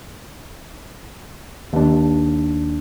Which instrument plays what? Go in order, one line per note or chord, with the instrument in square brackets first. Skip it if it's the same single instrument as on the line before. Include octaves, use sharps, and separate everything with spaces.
[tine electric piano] D#2 D4